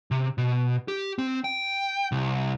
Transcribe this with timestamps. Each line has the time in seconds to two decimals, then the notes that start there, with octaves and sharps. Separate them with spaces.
0.11 C3
0.38 B2
0.88 G4
1.18 C4
1.44 G5
2.12 C2